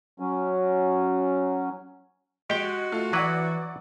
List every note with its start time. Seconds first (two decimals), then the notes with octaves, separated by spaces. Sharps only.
0.20 F#3 C#4
2.50 G#3 F#4 G4 G5
2.92 A3 F4
3.13 E3 F#3 E4 B4 D5 F#5 D6